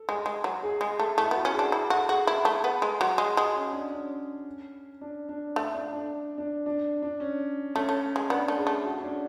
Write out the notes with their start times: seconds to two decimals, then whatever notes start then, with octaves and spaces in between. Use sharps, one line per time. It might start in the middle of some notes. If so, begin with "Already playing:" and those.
Already playing: A4
0.09 G#3
0.26 G#3
0.44 F#3
0.63 G#4
0.81 G#3
1.00 A3
1.18 A3 E4
1.31 B3 F#4
1.45 C#4
1.54 G#4
1.59 D4
1.72 E4
1.90 F#4 A4
2.09 F#4 G#4
2.27 E4
2.45 A3
2.64 B3
2.82 G#3
3.01 F#3
3.18 G#3
3.36 G#3 F#4
3.55 C#4
3.73 D4
3.92 C#4
5.01 D4
5.29 D4
5.56 A3
5.74 D4
5.93 D4
6.38 D4
6.66 D4
7.02 D4
7.20 C#4
7.75 A3 C#4
7.89 A3
8.16 G#3
8.29 B3 D4
8.48 A3
8.57 G#4
8.67 A3
8.85 F#4
8.99 C#4
9.04 D4